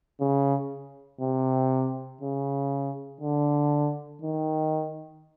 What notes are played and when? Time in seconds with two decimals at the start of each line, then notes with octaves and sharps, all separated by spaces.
0.21 C#3
1.21 C3
2.21 C#3
3.21 D3
4.21 D#3